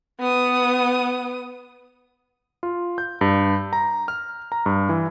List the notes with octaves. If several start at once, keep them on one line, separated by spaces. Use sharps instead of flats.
B3 D#6
F4
G6
G2
A#5
F6
A#5
G2
E3